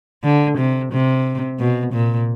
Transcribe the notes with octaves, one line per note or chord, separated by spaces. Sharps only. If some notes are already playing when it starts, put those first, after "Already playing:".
D3
C3
C3
B2
A#2